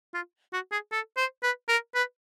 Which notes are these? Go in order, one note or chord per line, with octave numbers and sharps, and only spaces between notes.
F4
F#4
G#4
A4
C5
B4
A#4
B4